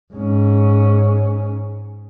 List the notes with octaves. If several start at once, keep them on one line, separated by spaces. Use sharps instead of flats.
G#2 C#4